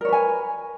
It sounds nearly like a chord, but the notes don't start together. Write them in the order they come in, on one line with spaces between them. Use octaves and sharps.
A#4 C#5 B4 G#5